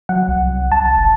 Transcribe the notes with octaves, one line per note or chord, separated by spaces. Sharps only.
F#3 F#5
C2
C2 A5
F#1